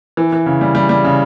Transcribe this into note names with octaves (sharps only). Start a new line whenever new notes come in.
E3
E3
C#3
G3
G3
G3
C#3